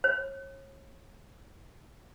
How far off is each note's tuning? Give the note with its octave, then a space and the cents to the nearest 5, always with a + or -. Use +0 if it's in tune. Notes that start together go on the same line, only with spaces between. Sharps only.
C#5 -30